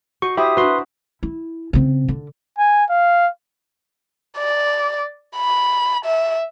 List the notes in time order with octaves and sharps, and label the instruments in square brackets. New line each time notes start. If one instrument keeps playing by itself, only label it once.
[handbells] F#4 [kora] D#5 [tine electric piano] C#6
[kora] E4 C5 [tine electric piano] G4 [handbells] E5 D#6
[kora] D4 F#4 [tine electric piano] B4 C6
[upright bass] E4
C#3 C4
D3
[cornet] G#5
F5
[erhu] D5
B5
E5